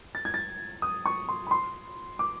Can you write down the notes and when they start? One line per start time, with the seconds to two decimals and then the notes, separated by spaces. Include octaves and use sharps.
0.15 A6
0.25 G#6
0.34 A6
0.82 D#6
1.06 C#6
1.29 C6
1.47 B5
1.51 C6
2.19 D6